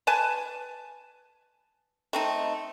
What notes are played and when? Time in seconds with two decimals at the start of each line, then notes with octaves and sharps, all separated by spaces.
0.07 B4 G#5 A5
2.13 A3 C4 D#4